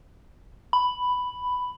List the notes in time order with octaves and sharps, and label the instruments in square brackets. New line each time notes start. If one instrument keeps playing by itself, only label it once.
[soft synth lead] B5